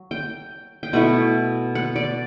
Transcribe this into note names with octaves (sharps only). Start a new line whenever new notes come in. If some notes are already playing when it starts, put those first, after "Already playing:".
Already playing: F#3
G5
G5
B2 A3 E4 F#5
F#5
D5